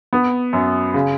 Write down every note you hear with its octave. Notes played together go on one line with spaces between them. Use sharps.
B3
F#2
C#3